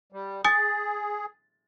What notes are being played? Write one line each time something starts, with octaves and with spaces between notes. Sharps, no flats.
G3
G#4 G#5 D#6 A6